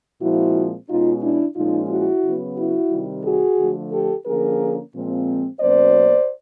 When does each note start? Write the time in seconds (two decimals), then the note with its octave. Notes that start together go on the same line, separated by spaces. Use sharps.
0.21 A#2 F3 G#3 C4 E4 F#4
0.88 B2 G#3 C#4 D#4 F4
1.22 D4 E4
1.56 A#2 F3 G#3 C#4 D#4 F4
1.89 E4 F#4
2.23 C#3 F#3 B3
2.57 E4 F#4
2.91 C3 D#3 G3
3.24 F#4 G#4
3.58 D3 F3 A3
3.93 G4 A4
4.26 D3 F3 A#3 C#4 G#4 A#4
4.93 A#2 F3 G#3 C4
5.60 B2 F#3 A#3 C#4 C5 D5